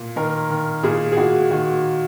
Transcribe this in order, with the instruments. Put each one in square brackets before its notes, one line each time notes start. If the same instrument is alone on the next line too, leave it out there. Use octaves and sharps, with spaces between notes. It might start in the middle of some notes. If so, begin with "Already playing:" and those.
Already playing: [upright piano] A#2
D#3 A#4
D#3
A#2 G#4
G#4
A#2 F#4
D#3 F#4